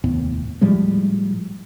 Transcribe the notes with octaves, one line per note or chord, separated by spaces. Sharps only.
F1 D#2 A2 B3
A2 F3 G3 G#3